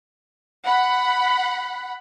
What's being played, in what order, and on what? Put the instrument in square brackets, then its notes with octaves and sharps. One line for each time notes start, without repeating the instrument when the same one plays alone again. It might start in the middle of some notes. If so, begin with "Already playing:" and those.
[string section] F#5 B5